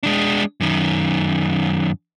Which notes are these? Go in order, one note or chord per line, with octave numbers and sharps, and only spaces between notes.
G#3 D4
F#2 D#3